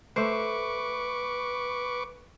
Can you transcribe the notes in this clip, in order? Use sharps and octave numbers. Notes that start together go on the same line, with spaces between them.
A3 B4 C5 C#6 D6